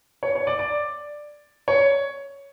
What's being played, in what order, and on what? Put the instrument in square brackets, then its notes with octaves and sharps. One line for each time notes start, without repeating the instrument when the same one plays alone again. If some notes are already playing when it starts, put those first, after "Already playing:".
[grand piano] C#5
C#5
D5
D5
C#5